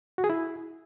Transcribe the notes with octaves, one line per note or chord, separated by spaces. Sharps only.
F#4
G#4
E4